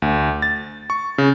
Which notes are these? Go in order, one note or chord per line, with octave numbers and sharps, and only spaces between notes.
D2
A6
C#6
C#3